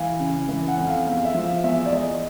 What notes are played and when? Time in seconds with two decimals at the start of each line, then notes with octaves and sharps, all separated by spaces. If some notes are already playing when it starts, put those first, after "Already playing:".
Already playing: E3 F5
0.19 C#3
0.49 E3
0.68 F#5
0.77 F2
0.87 F5
1.06 E2 F5
1.25 E5
1.34 F3
1.44 F5
1.63 E2 E5
1.86 D5
1.92 E2 D#5